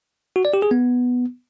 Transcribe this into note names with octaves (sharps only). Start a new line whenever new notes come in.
F#4
D5
G4
G#4
B3